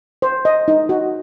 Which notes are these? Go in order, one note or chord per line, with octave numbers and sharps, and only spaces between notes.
C5
D#5
D#4
F#4